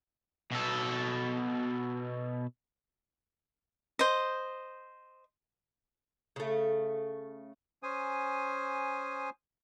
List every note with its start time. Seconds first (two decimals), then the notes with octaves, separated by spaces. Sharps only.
0.51 B2 A4
3.99 C5 D#5
6.36 C#3 A3
7.83 C#4 C5 G#5 D#6